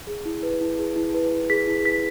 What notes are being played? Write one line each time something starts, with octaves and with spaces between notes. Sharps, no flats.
G#4
E4
B4
E4
G#4
E4
B4
E4
G#4 B6
E4
B4 B6